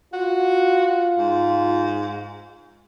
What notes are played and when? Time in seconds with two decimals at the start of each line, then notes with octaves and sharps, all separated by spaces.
0.13 F4 F#4
1.18 G#2